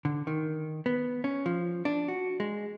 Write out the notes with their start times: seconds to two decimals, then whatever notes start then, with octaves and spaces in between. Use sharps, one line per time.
0.05 D3
0.27 D#3
0.86 B3
1.24 C#4
1.46 F3
1.85 D4
2.08 F#4
2.40 G#3